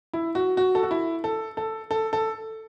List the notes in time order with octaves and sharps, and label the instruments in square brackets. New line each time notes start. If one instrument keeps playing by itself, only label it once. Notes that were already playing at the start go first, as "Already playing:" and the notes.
[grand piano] E4
F#4
F#4
A4
F#4
E4
A4
A4
A4
A4